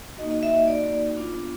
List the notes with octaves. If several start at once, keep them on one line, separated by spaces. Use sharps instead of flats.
A#3 D#4 F#4 D#5
D#5
E5
D#5
D5
B3 D4 F4